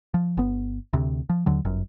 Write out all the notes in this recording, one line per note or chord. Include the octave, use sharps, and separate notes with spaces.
F3
G1 B3
D2 C3
F3
D#2 D3 F#3
G1 F#2